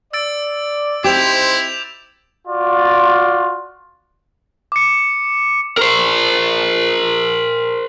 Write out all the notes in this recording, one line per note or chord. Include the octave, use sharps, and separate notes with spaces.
D5 E6 A6 D7
C4 D#4 E4 G4 C5 D6 G6 F7
F4 F#4 D5
D6 C#7
A#4 C5